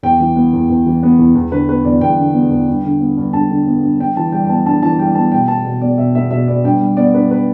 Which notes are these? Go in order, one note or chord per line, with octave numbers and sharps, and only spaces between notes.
E2 G5
E3
B3
E2
E2
E3
B3
E2
E2
D3 B4
B3 B4
E2 D5
E2 G5
D3
B3
E2
G2
D3
B3
G2
G2 A5
D3
B3
G2
G2 G5
E3 A5
G3 G5
G5
B3 A5
G2 A5
E3 A5
G3 G5
B3 A5
B2 G5
B3 A5
B2
B3 D5
B2 E5
B3 E5
B2 E5
B3 D5
G2 G5
G3
B3 D5
G2 B4
B4